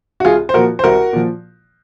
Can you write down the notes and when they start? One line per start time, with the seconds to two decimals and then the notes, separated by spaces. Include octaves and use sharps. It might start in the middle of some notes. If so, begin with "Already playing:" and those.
0.20 F#4
0.25 C2 F4 G#4
0.49 C5
0.54 A#2 F3 F#4 A#4
0.79 C5
0.84 C2 F#4 A#4
1.13 A#2 F3